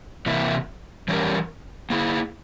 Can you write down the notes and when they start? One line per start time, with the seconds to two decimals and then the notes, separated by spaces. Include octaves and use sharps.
0.26 C3 E3 A#3 E4
1.08 E3 G3 C#4 G4 A#4
1.90 A#3 E4 G#4